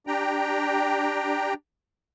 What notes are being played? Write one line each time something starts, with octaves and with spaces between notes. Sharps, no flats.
D4 G4 G5 A#5